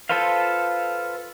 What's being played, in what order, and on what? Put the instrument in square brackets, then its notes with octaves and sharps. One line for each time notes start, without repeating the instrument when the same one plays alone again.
[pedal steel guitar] F4 A4 B4 C5 F5